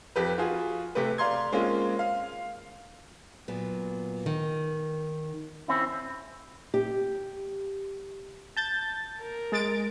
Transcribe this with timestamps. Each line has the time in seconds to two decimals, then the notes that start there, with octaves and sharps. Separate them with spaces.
0.16 F2 G4 B4
0.38 F4 F#4 G#4
0.95 C3 A3 G4 B4
1.18 D5 F5 A#5 C6 G#6
1.52 G#3 A#3 C4 C#4 F4
1.99 F5
3.48 A#2 F#3 B3
4.26 D#3
5.68 C4 C#4 E4
6.74 G4
8.57 A5 G6 A6
9.20 A#4
9.52 G#3 A6 D7